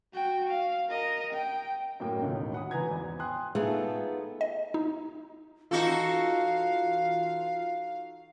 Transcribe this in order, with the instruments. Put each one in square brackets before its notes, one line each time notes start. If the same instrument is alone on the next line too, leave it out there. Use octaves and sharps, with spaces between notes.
[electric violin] F#4 G5
F5
A#4 D#5
G5
[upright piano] F#2 A2 A#3 G5
E1 C#2 A2 D#3
F#5 B5 D#6
E3 B4 G#5 A#5 G#6
G#1 E2
G5 G#5 C6 D#6 F#6
[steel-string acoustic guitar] A3 B3 D#4 F4 G#4 A4
[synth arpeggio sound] D#5
D#4
[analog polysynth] E3 F4 [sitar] D#4 F#4 A4 [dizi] F5